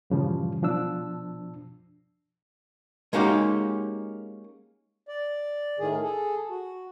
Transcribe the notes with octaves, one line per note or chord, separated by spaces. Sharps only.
G2 A#2 C#3 E3 F3 G3
B2 F3 D4 E6
G#3 A#3 C#4 D#4 F#4 G4
D5
A2 D#3 G#4
G#4 A4
F#4